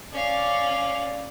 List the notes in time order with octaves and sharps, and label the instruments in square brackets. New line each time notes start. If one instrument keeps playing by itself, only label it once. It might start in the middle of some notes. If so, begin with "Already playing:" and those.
[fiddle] C#4 F5 [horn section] D5